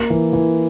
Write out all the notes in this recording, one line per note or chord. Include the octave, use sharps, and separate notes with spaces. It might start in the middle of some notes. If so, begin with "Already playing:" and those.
Already playing: A#3
E3
E3